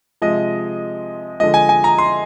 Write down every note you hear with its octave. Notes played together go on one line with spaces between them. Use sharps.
C3 F3 G#3 D#5
D3 F3 G#3 D#5
G#5
G#5
A#5
C6